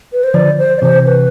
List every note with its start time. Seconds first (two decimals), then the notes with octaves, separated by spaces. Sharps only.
0.13 B4
0.24 C5
0.34 D3 F3 D5
0.59 C5
0.77 D5
0.82 C3 E3 C5
1.06 B4